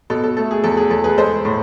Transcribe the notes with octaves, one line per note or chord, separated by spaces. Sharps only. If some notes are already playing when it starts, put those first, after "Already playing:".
B2 A4
A4
A3 A4
G#4
E2 A4
G#4
E2 A4
G#4 B4
G#3 A4 C5
A2